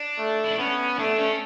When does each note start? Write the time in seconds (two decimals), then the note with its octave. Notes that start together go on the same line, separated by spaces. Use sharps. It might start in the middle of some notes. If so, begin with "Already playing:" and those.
Already playing: D4
0.19 A3
0.44 E4
0.51 D4
0.58 B3 C#4
0.99 A3 D4
1.18 C#4